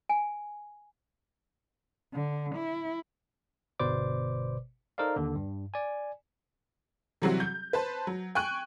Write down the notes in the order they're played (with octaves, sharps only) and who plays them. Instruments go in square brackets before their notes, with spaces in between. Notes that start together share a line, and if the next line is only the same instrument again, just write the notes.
[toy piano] G#5
[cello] D3
E4
[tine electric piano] G1 B2 B4 C5 D5 D6
D#4 A4 A#4 C5 D5 F5
D#2 D3
G2
D5 G#5
[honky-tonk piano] C3 E3 F#3 G3 C4 F#4
G6
B4 C5 A5
F#3
G5 G#5 C#6 F#6